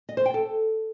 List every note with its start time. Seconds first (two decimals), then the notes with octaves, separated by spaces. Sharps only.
0.09 D#5
0.17 C5
0.26 G5
0.34 A4